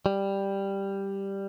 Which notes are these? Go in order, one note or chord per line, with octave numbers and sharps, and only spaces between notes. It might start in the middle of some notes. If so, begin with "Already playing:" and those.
G3